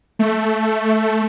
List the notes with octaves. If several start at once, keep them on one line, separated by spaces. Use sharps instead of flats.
A3